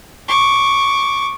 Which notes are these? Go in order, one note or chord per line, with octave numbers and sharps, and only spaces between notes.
C#6 D6